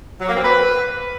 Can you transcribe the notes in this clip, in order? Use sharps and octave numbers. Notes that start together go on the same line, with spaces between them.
F#3
A#3
C4
B4